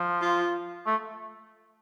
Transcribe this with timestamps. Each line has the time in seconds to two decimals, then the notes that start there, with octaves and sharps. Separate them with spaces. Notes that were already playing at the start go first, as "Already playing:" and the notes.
Already playing: F3
0.21 F4
0.87 A3